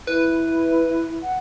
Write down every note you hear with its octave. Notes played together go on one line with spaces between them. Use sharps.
E4 B4
F#5